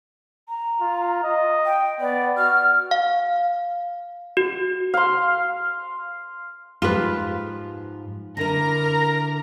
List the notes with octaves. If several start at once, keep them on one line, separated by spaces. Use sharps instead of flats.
A#5
F4
D#5
G5
B3 D5
F#4 F6
F5
F#4
F5 C6
G#2 F3 F4 G4 B4
D3 E4 A#4 A#5 A#6